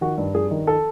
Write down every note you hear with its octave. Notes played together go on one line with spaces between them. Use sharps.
D#3 F#4
G2
G2 G#4
D#3
A4